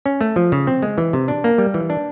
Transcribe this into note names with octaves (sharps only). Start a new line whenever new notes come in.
C#4
A3
F3
C#3
C4
G#3
E3
C3
D4
A#3
G3
E3
D4